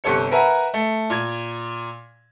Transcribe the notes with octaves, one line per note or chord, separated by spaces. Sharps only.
G1 C3 A4 C#5 C#7
A#4 B4 E5 F#5 G#5 A#5
A3
A#2 G#6